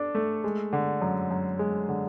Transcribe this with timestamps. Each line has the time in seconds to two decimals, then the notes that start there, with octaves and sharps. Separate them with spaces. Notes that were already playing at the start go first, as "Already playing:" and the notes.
Already playing: D4 A4
0.15 A3
0.44 G#3
0.73 D3
1.02 F#2
1.31 F#2
1.59 G#3
1.89 D3